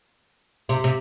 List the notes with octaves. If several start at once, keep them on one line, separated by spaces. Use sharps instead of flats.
C3
C3